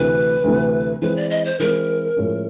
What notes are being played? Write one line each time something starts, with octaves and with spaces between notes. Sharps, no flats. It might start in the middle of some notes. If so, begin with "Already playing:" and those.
Already playing: D2 C3 E3 A3 B4
D2 C3 E3 A3
E3 G#3 C4 B4
D5
D#5
C5
E3 G#3 C4 A#4
A2 F3 G#3 C#4